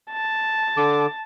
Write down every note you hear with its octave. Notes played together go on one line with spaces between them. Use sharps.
A5
D3 D6